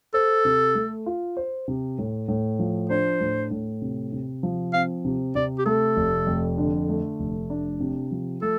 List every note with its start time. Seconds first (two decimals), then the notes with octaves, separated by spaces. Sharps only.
0.14 A4 C5
0.45 C3
0.75 A3
1.06 F4
1.37 C5
1.68 C3
1.98 A2
2.28 A2
2.59 F3
2.90 D4 C5
3.20 A2
3.51 A2
3.82 C3
4.12 C3
4.43 F3
4.73 C4 F5
5.05 C3
5.35 C3 D5
5.59 G4
5.65 A3 A4
5.97 F1
6.27 F2
6.58 D3
6.89 A3
7.20 F1
7.50 D4
7.80 C3
8.11 F3
8.42 A3 A4